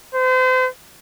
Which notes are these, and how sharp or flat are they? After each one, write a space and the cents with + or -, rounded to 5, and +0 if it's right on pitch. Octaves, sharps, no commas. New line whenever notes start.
C5 -35